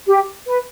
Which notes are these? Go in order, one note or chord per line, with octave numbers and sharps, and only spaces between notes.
G4
B4